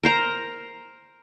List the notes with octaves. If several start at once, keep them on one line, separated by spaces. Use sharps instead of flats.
A#4 C5 A#5